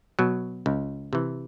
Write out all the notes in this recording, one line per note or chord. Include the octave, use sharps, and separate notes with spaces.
B2 F#3
C#2
C3 E3